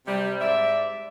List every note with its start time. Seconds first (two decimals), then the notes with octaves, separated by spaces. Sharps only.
0.07 C3 G3
0.40 G#2 D5 E5